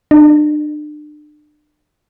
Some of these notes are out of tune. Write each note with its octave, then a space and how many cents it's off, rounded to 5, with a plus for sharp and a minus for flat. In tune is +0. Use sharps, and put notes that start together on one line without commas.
D4 +35